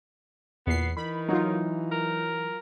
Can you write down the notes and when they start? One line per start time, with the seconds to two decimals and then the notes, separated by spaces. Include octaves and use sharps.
0.67 E2 A#2 B3 C7
0.97 D#3 E3 B5
1.29 F#3 D#4 F4
1.92 A#4